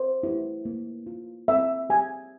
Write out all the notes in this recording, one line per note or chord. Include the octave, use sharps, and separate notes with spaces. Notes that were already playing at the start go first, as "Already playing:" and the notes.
Already playing: C5
E4 G4
A#3
F4
C4 E5
G4 G#5